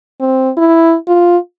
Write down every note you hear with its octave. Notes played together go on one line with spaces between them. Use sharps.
C4
E4
F4